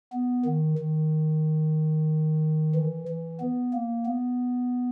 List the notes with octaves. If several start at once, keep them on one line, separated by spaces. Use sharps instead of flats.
B3
D#3
D#3
E3
E3
B3
A#3
B3